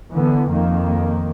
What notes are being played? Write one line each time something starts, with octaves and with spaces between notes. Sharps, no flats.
D3 E3 B3
F2 D#3 A#3